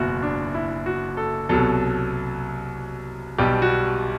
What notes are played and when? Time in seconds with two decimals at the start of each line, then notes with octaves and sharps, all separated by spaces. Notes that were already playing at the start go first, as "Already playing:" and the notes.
Already playing: F#1 E2 B2 E4 F#4
0.23 D4
0.54 E4
0.86 F#4
1.17 A4
1.49 C2 B2 F#3 A4
3.38 B1 B2 G3 G4
3.62 F#4